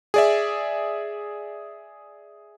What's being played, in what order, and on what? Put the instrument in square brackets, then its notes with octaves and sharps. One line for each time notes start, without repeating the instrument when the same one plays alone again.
[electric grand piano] G#4 D5 E5